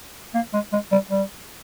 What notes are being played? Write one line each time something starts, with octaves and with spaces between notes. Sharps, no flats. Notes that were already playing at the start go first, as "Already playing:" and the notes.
A#3
G#3
G#3
G3
G3